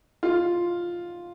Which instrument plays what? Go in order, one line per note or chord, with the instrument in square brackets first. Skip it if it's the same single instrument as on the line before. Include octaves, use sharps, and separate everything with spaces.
[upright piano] F4